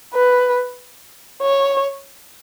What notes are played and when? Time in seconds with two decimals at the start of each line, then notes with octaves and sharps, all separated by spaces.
0.14 B4
1.42 C#5